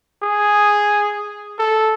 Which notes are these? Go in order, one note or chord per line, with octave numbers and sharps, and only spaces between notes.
G#4
A4